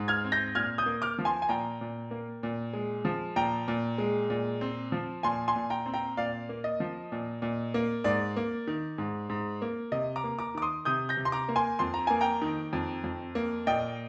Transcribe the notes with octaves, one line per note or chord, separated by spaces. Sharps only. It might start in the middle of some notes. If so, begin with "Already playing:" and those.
Already playing: G#2
F6 G#6
C4
G6 A#6
A#2 F6 G#6
D#6 G6
A#3
D6 F6
F3
G#5 C6
G#5
A#2 G5 A#5
A#2
A#3
A#2
G#3
F3
A#2 G5 A#5
A#2
G#3
A#2
C4
F3
A#2 G#5 C6
G#5 C6
A#2
G5 A#5
C4
G5 A#5
A#2 D5 F5
A#3
D#5
F3
A#2
A#2
A#3
G#2 D5
A#3
D#3
G#2
G#2
A#3
C3 D#5
A#5 D6
A#3
A#5 D6
D#3 D6
C6 D#6
C3 D#6 G6
G6 A#6
C3
C6
A#5 D6
A#3
G#5 C6
F2 C6
A#5
A#3 G#5
G5 A#5
D#3
F2
F2
A#3
A#2 D#5 G5